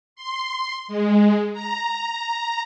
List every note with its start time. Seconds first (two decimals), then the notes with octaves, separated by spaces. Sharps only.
0.16 C6
0.88 G#3
1.53 A#5